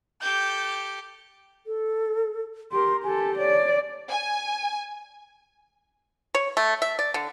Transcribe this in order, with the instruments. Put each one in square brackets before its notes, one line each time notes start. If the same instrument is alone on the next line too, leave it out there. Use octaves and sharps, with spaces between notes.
[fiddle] G4 A4 [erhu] G6
[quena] A4
[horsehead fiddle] G4 A#4 [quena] C6
[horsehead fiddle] G4 A4 [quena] G#5
[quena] C#5 [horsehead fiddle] D5
[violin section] G#5
[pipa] C#5
A3
E5
D5
D3